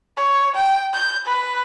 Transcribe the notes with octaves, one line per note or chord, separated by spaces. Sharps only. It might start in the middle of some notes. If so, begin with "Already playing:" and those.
C#5
G5
G6
B4